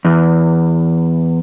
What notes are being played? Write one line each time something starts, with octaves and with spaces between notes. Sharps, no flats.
E2